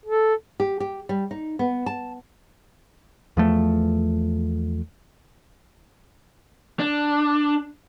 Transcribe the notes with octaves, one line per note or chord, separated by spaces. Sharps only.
A4
G4
G4
G3
D#4
B3
A5
E2 F3 A3
D4